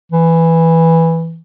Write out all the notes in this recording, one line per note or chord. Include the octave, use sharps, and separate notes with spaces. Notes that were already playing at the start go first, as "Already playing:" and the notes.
E3